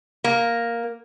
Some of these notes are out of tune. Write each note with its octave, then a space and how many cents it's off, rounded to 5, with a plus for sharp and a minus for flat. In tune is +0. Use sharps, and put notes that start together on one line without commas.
A#3 +0